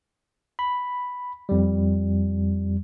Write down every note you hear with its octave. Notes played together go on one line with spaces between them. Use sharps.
B5
F2 G3